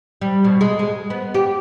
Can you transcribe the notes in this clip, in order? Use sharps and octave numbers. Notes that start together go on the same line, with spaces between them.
G3
B2
G#3
G#3
B3
G4